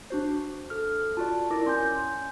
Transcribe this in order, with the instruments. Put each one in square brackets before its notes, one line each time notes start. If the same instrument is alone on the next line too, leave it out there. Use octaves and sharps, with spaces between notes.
[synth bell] D4 F#4 C5
[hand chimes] A4 F6
[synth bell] F4 F#4 D5 [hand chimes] A5
[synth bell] E4 D5 [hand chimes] A#4 D6 A#6
[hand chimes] C#4 G#5 G6 [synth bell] C6